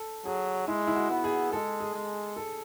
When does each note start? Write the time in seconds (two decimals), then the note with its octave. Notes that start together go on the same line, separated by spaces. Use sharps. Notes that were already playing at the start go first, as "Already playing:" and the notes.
Already playing: A4
0.25 F#3 G#4
0.67 G#3 E4
0.87 E4
0.96 F#4
1.10 B3
1.24 G#4
1.52 G#3 A4
1.80 G#4
1.94 G#3
2.37 A4